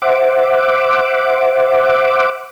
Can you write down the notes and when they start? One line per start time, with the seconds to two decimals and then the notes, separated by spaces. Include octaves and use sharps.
0.02 C5 E5 F#5 D6